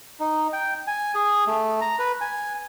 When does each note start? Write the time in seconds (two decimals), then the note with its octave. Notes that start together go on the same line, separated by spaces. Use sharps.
0.20 D#4
0.53 G5
0.87 G#5
1.15 G#4
1.47 A3
1.81 A#5
1.99 B4
2.21 G#5